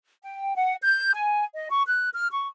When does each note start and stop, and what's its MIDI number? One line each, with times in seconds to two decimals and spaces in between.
0.22 0.54 79
0.56 0.75 78
0.83 1.12 91
1.14 1.43 80
1.55 1.69 75
1.71 1.82 85
1.87 2.09 90
2.14 2.27 89
2.31 2.46 85